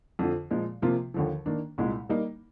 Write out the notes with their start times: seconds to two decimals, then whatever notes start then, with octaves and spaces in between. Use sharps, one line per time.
0.19 F2 D3 F3
0.51 A#2 F3 G#3
0.82 C3 F3 A#3 F4
1.14 D#2 D3 F3
1.46 D#3 A#3 D4
1.78 C2 A#2 G#3
2.09 G3 A#3 D#4